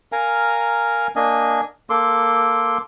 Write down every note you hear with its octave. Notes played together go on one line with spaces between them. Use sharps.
A#4 F5 G#5 A#5
A#3 D4 D#5 G#5
A#3 A4 C6 D6